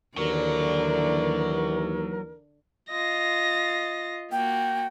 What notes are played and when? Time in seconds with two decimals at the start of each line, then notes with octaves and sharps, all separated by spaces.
0.17 D#2 D3 E3 F#3 A#4 D5
2.90 F4 D#5 A#6
4.32 A#3 F#4 G5